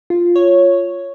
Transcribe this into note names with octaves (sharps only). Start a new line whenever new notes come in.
F4
C#5